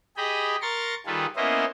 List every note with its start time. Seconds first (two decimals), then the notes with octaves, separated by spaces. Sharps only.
0.17 G4 G#4 D#5 G5 B5
0.62 A#4 A#5 C6 C#6 A6
1.06 D#3 G3 F4 G#4 A4 B4
1.36 A#3 B3 C#4 E4 C5 D#5